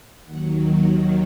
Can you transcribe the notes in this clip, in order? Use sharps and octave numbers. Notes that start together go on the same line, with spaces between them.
D#2 D#3 F#3 F#5
F#5